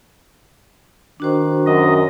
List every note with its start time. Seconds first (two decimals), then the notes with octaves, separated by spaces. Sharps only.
1.20 D#3 D4 F#4 C5
1.66 F#2 D#5